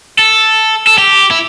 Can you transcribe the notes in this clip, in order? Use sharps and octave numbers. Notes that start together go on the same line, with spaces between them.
A4
A4
G4
E4